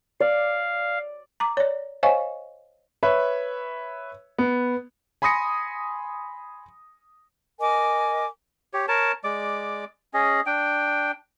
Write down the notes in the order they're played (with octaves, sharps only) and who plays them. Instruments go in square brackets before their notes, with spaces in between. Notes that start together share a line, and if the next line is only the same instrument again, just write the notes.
[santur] D5 [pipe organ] F5
[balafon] A#5 D6
C#5 D5
C5 C#5 D#5 F5 G#5 C#6
[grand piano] B4 C#5 E5
B3
[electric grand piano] G#5 B5 C6 D#6 A#6 C#7
[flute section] A#4 D#5 G#5 D6
[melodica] G4 C#5
A#4 C#5 A5
G#3 D5 D6
C#4 G#4 D#5
D4 G5